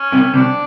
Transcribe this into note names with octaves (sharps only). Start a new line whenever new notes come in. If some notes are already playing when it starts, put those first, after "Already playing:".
Already playing: C#4
C2 C3
C2 C3 D4